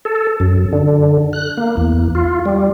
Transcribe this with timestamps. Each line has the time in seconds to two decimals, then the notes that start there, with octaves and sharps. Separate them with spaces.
0.05 A4
0.40 F#2
0.73 D3
1.33 F#6
1.57 A#3
1.77 E2
2.15 F4
2.45 G3